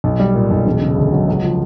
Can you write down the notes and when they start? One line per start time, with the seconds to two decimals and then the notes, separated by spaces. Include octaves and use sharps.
0.04 B1
0.19 G3
0.35 A#2
0.51 B1
0.66 E1
0.81 C#3
0.97 D2
1.12 F#3
1.28 C#2
1.43 F3